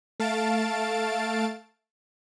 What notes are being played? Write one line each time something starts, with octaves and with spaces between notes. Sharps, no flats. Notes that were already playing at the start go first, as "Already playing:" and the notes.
A3 F5 A5 A6 D7